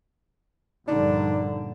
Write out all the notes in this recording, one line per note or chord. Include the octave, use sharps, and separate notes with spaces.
A#1 G2 D3 D4 D#4